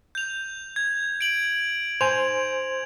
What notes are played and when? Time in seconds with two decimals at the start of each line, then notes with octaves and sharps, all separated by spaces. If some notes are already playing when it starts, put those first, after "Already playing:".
0.15 G6 F7
0.76 G#6
1.21 D7 F#7
2.01 C5 G#5 F7